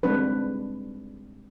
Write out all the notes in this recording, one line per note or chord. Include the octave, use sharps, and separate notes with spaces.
G3 G#3 C4 D4 B4